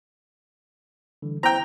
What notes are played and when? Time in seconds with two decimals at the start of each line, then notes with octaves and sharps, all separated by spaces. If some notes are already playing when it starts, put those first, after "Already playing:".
1.22 D3 E3 G3
1.43 B3 E4 C5 G5 A#5